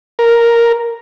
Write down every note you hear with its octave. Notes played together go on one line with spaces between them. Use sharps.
A#4